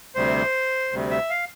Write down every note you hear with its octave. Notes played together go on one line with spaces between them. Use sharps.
D2 C3 G3 C5
D2 C3 G3
E5
F5